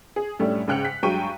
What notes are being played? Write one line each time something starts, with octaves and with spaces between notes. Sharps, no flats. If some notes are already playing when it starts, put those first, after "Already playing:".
G#4
F#2 A2 G3 A3 D4
G#2 C#3 G5 F#6 C#7 F7
B6
G2 F#3 G#3 G5 C#6 D#7